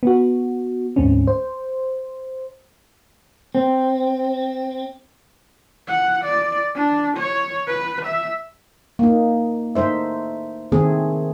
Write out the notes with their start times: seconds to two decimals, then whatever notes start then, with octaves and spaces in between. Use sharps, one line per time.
0.03 B3 F#4
0.96 D2 G#2 A3 C4 C#4
1.27 C5
3.55 C4
5.87 F#5
6.24 D5
6.75 D4
7.18 C#5
7.67 B4
8.06 E5
8.99 A#3 D#4
9.75 A3 D#4 C5 E5
10.72 D#3 A3 C4 G#4